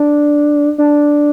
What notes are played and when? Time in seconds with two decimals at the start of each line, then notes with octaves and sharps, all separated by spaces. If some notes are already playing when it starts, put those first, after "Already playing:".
Already playing: D4
0.78 D4